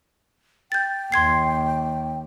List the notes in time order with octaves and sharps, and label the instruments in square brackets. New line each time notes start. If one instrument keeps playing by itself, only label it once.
[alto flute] G5 [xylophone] G6 A6
[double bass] D#2 [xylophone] C6 G#6 C7